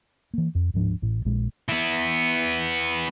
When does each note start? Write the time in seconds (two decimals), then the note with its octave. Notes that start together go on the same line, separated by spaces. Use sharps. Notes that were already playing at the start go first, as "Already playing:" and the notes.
0.34 E3 A#3
0.55 F2
0.74 D1 G#2 F3 D4
1.02 A1 A2
1.25 A#1 A#2 G#3
1.69 E3 B3